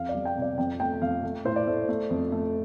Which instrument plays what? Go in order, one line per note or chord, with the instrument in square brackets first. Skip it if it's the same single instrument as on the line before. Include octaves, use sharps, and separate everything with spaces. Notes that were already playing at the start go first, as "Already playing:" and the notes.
Already playing: [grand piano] F2 F5
D5
G3
G5
C3
D5
F2 G5
A3 G5
F2 F5
A3
A2 C5
D5
A3
A3
F2
A3